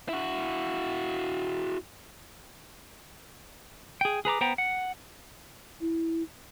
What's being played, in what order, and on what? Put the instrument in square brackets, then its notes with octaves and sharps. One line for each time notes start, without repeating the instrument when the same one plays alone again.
[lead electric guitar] E4 F#4
[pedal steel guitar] G#4 G5
G#4 B4 A#5 D6
B3 C5 G5 A#5
F#5
[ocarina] E4